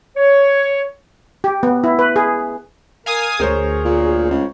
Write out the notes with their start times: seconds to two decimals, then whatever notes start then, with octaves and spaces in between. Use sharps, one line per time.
0.17 C#5
1.44 G4
1.63 B3
1.84 E4
1.99 B4
2.16 G#4
3.06 A#4 F5 G#5 D#6
3.40 D2 G#4 A#4 C5 C#5
3.85 A#2
4.31 C#2